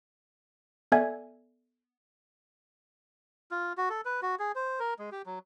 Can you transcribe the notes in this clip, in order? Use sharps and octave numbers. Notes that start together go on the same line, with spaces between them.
B3 A4 D5 E5 G#5 G#6
F4
F#4
A4
B4
F#4
G#4
C5
A#4
G#3
G4
F#3